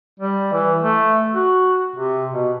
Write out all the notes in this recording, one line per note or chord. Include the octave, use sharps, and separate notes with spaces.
G3
E3
A3
F#4
C3
B2